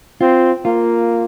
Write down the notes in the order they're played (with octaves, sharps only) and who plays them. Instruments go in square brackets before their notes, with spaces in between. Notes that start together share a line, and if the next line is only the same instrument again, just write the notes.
[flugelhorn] C4 [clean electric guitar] F4
[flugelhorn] A#3 [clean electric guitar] F4